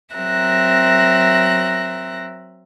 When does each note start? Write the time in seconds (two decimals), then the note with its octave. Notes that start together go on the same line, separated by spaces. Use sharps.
0.14 F#3 C4 A#4 E5 F#6 A#6